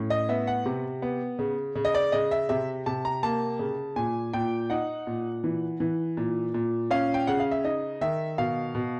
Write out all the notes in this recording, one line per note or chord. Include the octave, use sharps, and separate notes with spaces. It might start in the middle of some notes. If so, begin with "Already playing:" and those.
Already playing: A2 C#4
D#5
B3 E5
F#5
C3
B3
C#3
C#3
D#5
D5
C#3 D#5
E5
C3 E5
C3 A5
A#5
A#3 A5
C#3
A#2 G#5
A#2 G5
D#4 F#5
A#2
E3
E3
A#2
A#2
C#4 F5
G5
C#3 F#5
F5
E5
D#4 D#5
D#3 E5
B2 F5
B2